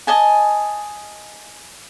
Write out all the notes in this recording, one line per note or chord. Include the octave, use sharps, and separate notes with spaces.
D#5 G#5 A5